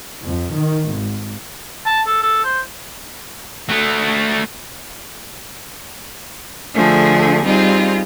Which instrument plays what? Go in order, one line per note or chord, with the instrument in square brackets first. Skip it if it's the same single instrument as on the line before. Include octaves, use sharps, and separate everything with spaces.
[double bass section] F2
D#3
G#1
[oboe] A5
A4
A4
C5
[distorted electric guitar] A3 F#4
[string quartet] D3 F3 A3 G#4
G3 C4 D#4 F4 G#4